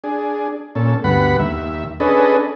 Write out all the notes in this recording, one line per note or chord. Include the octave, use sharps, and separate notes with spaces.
D4 G#4
A#2 C#4 A4
D2 G2 B3 F#5 B5
D#2 E5
C#4 D4 G#4 A4 B4 D#5